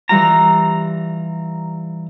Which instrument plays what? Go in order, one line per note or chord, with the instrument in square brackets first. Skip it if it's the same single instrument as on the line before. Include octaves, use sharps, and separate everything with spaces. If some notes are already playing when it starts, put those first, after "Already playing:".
[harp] E3 G3 F4 [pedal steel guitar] A#5